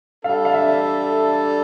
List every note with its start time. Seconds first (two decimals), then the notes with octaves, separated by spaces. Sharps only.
0.24 G3 D4 A4 F5
0.45 F5
0.54 E5